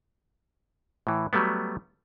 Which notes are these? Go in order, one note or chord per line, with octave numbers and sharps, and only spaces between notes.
A2 E3
F#3 G3 A3 B3